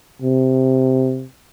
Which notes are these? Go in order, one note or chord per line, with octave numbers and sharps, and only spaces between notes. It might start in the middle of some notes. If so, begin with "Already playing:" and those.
C3